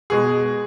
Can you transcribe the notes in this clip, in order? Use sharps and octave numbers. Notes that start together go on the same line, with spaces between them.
B2 G#3 G#4